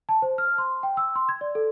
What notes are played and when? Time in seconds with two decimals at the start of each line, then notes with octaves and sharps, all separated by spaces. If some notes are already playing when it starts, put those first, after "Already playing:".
0.09 A5
0.22 C5
0.38 F6
0.58 C6
0.83 G5
0.97 E6
1.15 C6
1.29 G#6
1.41 D5
1.55 A4